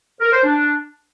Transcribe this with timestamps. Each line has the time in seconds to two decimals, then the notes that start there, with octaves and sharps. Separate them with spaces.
0.21 A#4
0.32 C5
0.44 D4